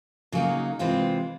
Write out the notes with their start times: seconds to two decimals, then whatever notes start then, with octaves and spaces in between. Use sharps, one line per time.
0.32 C#3 F#3 A#3 D#4
0.79 C3 E3 G#3 C4 F4